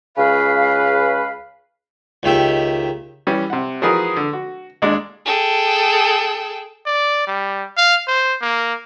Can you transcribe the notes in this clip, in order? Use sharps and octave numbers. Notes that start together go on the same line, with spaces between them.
C#2 C#3 B4 F5
C#2 D#3 G4 E5
E3 G3 C#4
C3 F#5
E3 F3 F#4 G#4 A#4 B4
D3
F#4
D#2 G#3 D4
G#4 A4 G5
D5
G3
F5
C5
A#3